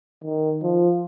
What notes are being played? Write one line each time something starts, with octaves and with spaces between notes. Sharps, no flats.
D#3
F3